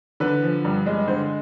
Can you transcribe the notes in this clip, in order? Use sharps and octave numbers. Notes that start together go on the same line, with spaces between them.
D3 B4
F3
G2
G#3
D3 C5